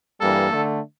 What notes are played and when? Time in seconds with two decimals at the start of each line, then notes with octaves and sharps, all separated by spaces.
0.20 G2 E3 G3 A#3 A4
0.51 D3 A3